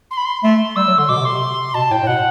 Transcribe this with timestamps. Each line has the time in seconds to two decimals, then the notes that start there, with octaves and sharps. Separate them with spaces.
0.11 C6
0.17 B5
0.25 C6
0.43 A3 C6
0.76 G3 E6
0.87 F#3
0.98 D3 C6
1.09 B2 D6
1.15 D3
1.20 C3
1.25 C6
1.31 C3
1.74 B2 A5
1.90 A2 G5
2.02 A2
2.07 B2 F#5